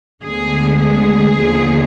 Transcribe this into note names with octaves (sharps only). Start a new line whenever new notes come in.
D2 D3 G#3 B3 G#4
G#4
D#2 D3 F3 B3